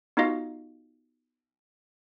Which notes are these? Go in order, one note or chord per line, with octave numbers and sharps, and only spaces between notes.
B3 D#4 F4 F#4 D#5 F5